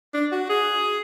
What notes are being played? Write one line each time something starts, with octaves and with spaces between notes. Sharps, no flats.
D4
F#4
G#4